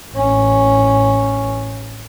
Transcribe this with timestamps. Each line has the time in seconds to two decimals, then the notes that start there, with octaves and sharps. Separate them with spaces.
0.13 A1 C#4